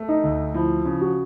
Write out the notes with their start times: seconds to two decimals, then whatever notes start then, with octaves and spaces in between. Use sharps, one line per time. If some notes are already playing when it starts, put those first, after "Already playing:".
Already playing: A3
0.08 D#4
0.24 D2
0.54 F3 E4
0.85 C#3
1.01 F#4